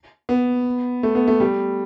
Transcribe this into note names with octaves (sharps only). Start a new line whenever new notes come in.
B3
A3
B3
A3
G3